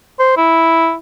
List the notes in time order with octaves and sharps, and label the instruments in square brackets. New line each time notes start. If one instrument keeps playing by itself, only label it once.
[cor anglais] C5
E4